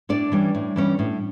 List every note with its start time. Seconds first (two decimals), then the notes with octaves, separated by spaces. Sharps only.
0.09 A2 D4 D5
0.32 E3 G3 C#4
0.55 A2
0.76 E3 G3 C#4
0.99 A2